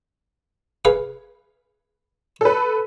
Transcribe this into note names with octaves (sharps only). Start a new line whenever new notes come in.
G#4 B4 F5
A4 B4